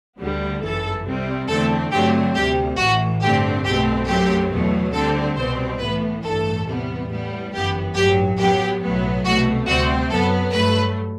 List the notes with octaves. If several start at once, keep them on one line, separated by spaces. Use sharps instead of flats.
D2 D3 G3 B3
G1 F#2 E3 A4
C2 C3 G3 C4
E2 D3 A3 C4 A4
G2 D3 F#3 A3 C4 G4
D2 C3 G3 G4
A1 A2 E3 F#4
G2 D3 A3 C4 G4
B1 B2 A3 C4 G4
F#2 F#3 A3 C4 G4
E2 B2 F#3 A3
D2 D3 G3 C4 A4
C2 B2 G3 C4 C5
A2 E3 B3 B4
A1 G2 E3 A3 A4
E2 C3 G3 B3
A2 G3 B3
G1 F#2 E3 B3 G4
A1 G2 F#3 G4
F#2 F#3 B3 G4
B1 A2 F#3 B3
C2 B2 A3 F#4
D2 C3 G3 C4 F#4
F#2 F#3 B3 A4
G2 F#3 A3 B4